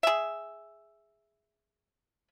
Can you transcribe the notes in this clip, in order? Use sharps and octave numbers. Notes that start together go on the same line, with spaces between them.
G#4 E5